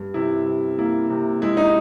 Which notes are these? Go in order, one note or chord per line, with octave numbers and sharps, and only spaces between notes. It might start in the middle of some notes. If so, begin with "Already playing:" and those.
Already playing: G2
C3 E4
C3
A#3 E4
C3
G#3 E4
D#4